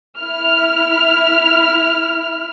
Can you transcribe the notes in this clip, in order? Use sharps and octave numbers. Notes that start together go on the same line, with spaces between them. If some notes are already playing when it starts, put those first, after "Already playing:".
E4 F6